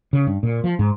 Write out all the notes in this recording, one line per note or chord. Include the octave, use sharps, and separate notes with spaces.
C#3
G2
A#2
F3
G#2